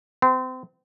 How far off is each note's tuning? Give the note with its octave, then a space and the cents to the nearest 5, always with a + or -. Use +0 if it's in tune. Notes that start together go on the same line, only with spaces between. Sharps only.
C4 -30